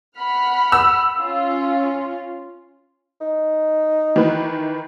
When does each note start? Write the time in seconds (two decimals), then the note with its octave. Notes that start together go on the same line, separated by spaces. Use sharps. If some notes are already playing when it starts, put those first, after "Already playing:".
0.19 F#5 B5 F6
0.72 E6
1.20 C#4 F4
3.21 D#4
4.16 D#3 E3 B4